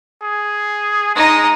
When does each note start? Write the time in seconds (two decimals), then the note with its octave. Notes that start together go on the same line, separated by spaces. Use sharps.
0.22 G#4
1.15 G#3 D#4 D#5